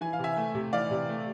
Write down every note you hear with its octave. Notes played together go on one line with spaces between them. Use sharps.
E3 G#5
F5
C3 E5 G#5
A3
C3
E3 D5 F5
C3
A3